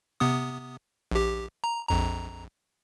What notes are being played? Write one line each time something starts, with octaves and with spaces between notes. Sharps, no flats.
C3 B3 D#6
A#1 G4
A#5
A#1 F2 A#5